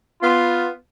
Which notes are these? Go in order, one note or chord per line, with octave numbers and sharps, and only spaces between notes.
B3 F4